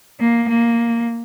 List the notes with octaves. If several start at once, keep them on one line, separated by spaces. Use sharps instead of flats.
A#3
A#3